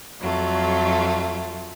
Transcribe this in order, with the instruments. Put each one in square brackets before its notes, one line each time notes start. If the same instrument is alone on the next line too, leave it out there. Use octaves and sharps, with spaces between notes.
[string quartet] F2 F#3 A3 F4